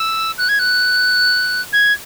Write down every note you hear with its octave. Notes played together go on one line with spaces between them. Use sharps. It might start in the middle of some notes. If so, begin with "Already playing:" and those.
Already playing: E6
F#6
G#6
F#6
G#6